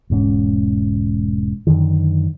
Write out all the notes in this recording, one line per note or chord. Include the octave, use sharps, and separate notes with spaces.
E1 G#2 C4 C#4
F#2 D3 D#3